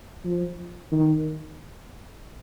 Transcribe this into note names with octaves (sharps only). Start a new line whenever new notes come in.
F3
D#3